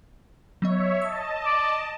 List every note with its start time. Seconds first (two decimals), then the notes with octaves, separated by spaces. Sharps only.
0.62 F#3 B3 C#5 D#5 E5
1.02 D#5 A5 E6
1.45 D5